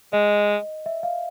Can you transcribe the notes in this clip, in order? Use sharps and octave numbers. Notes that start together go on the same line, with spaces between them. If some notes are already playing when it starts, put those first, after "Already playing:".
G#3 D#5
E5
F5